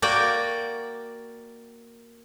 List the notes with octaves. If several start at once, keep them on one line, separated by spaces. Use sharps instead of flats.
A#3 F#4 A#4 D5 G5